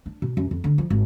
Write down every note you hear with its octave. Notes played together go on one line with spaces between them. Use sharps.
D4
B2
F#2
F2
D3
F3
G#1